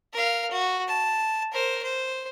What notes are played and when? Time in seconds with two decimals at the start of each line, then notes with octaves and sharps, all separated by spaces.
0.13 A#4 F5
0.51 F#4
0.88 A5
1.52 A#4 C5
1.83 C5